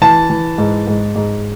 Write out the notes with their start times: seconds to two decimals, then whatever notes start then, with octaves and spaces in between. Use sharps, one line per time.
0.02 E3 A5
0.30 E3
0.58 G#2
0.87 G#2
1.16 G#2